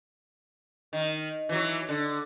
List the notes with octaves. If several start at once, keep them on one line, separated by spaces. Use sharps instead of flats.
D#3
E3 F#3
D3